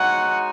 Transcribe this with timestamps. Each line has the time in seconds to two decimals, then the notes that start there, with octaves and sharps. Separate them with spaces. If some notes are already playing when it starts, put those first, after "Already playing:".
Already playing: G#3 D#4 F#4 C#5 F#5 G#5